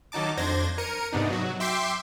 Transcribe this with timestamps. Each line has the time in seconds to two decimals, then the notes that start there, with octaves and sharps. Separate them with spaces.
0.12 D#3 F#3 D#4 A5 D6
0.37 F2 D4 C5 G#6 A#6
0.78 A#4 C#7 D#7
1.13 G#2 C3 B3 D4 D#4
1.30 F#3 F#4
1.60 E5 G5 C6 D6 C7